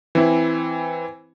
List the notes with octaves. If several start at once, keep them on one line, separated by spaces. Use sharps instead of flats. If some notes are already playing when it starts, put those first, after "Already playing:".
E3 C4 E4